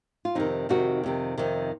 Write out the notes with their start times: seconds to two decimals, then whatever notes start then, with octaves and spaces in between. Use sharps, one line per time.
0.25 F4
0.35 F2 C3 D#3 C4 D#4
0.69 F2 C3 D#3 D#4 F#4
1.04 F2 C3 D#3
1.37 F2 C3 D#3